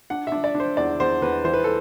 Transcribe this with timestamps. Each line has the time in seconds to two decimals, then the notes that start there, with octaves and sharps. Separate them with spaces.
0.10 D4 F#5
0.27 D4 E5
0.44 D5
0.55 D4
0.60 C5
0.77 E2 D5
1.00 E2 C5
1.22 E2 B4
1.44 E3 C5
1.54 B4
1.64 A4